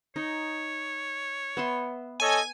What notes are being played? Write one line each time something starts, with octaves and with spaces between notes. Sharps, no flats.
D#4 C#5
B3 E5 C6
A4 C#5 D#5 G#5